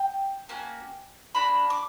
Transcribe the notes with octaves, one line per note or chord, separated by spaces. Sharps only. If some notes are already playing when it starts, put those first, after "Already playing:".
Already playing: G5
A#3 C#4 F#4
A#3 D4 F#4 B5
D6